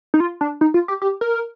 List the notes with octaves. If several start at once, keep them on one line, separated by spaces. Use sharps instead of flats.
D#4
F4
D4
D#4
F4
G4
G4
A#4